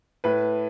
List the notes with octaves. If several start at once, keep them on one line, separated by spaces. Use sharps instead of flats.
A2 B4